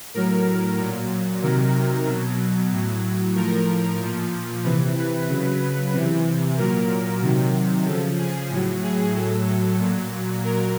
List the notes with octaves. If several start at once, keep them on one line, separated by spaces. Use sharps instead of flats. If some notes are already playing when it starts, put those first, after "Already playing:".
A2 F#3 A#4
A#2 F#3
C3 D#3 F#3 A#4
B2 F#3
A2 F#3
A2 F3 A#4
A#2 F3
C3 E3 B4
B4
C#3 F#3
C3 E3
A#2 F#3 A#4
C3 D#3 F#3
C#3 F3 A4
G#4
A2 F#3
G#4
A2 F#3 A4
A#2 F#3
A#2 F#3 A#4